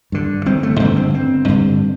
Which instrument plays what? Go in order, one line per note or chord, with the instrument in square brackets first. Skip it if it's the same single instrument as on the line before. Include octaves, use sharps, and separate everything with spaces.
[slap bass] G2 D3
G1 C4
A3
G2 C4
D3
C4
G1 C4
G2 D3